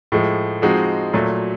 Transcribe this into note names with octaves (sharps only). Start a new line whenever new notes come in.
A2 F3 G#3
F3 G#3 C4 D#4 F#4
A#2 F#3 A3